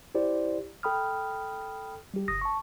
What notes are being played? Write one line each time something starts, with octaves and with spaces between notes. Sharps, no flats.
E4 G4 C5 D5
A4 G5 B5 D#6 F6
G3 G4
G1 D#6 A#6
A5 C#6